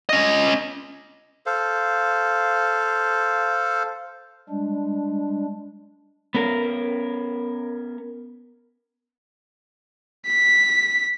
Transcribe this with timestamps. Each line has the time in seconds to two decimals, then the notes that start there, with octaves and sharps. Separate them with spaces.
0.09 C#4 D#5
1.46 A4 C5 F5
4.49 G3 G#3 D4
6.34 B3 C#4 A#4
10.27 B6